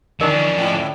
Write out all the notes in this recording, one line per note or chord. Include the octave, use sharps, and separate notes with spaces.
D3 F3 C#4 D4 A#4 D#5
G#2 E4